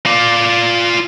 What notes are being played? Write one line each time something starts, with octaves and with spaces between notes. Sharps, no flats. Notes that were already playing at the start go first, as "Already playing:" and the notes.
F4 D5